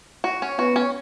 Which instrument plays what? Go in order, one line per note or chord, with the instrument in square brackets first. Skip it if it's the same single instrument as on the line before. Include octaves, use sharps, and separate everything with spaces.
[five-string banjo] F#4
C#4
[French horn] B3 [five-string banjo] F#4
[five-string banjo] C#4